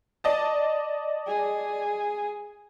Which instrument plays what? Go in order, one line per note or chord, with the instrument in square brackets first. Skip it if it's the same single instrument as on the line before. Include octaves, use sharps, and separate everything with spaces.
[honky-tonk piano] D5 D#5 A5
[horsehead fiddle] G#4